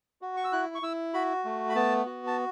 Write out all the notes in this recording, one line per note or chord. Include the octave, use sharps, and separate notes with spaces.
F#4
C#6
E6
E4 F#6
C#6
E4 E6
F#4 B5
A3
B5
B3 A5
F#4
A5